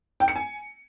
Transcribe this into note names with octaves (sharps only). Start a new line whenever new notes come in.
G5
C#7
G#5